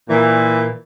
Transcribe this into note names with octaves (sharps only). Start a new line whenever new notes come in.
A#2 E3